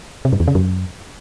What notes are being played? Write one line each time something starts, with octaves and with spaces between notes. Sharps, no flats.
C3
G2
E2
C#3
F#2